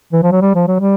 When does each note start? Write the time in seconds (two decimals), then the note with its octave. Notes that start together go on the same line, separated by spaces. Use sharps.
0.13 E3
0.23 F3
0.32 F#3
0.42 G3
0.55 F3
0.67 F#3
0.80 G3